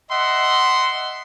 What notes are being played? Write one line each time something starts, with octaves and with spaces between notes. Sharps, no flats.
D#5 E5 F#5 C6